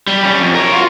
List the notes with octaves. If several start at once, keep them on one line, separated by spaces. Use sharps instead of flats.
G3
G3 C#4
F2
A#4 C#5
F4 F#4